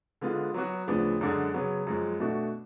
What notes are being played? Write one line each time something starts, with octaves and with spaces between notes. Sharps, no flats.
D3 G#3 B3 F4
F#3 B3 F#4
D2 C#3 F3 B3 D4
F#2 D3 G#3 D4 G#4
C#3 F#3 B3
F#2 F3 G#3
B2 A3 D4 F#4